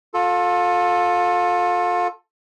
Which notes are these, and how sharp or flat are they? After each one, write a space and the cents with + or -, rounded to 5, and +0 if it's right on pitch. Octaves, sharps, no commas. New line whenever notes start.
F4 +30 A4 +0